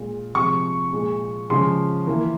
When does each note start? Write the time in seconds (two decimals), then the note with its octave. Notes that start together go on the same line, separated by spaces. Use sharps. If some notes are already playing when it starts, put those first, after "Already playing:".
Already playing: A#2 G#3
0.34 C3 F3 G#3 C#6
0.92 A#2 G#3
1.50 C#3 F3 G#3 C6
2.07 E3 A#3